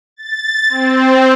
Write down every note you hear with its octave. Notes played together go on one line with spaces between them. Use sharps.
A6
C4